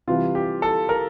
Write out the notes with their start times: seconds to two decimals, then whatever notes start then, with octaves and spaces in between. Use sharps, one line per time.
0.07 C3 E3 G3 F4
0.35 G4
0.62 A4
0.89 A#4